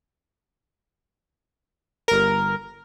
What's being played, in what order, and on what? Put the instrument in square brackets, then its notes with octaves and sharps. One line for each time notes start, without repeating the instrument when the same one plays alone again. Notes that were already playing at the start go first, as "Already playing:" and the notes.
[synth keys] G1 A#4